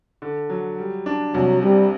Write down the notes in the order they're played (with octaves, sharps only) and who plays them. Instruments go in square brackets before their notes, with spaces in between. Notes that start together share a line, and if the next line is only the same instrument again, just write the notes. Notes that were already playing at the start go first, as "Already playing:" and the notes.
[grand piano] D3
F#3
G3
D4
[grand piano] C2 [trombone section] F#3
[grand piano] C3 [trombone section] G3